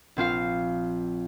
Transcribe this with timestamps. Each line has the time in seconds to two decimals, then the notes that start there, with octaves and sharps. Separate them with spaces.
0.17 A#1 C4 F4 F5